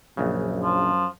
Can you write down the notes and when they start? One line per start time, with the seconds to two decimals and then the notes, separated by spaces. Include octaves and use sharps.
0.17 A#1 F#2 C#3
0.62 F3